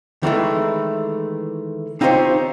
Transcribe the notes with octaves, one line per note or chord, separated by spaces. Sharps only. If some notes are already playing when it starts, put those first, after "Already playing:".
D#3 E3 G#3 A3
C4 D#4 F4 G4 C5 C#5